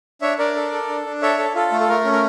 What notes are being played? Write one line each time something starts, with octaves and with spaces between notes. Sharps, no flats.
D4 C#5 E5
D4 A#4 D5
A4
A4
D4
D4
A4 C#5 E5
A4
F4 A4
A3
A4
A3 A#4
C#4
A#4